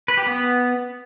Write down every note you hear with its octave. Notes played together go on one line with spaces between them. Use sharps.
B4
G4
B3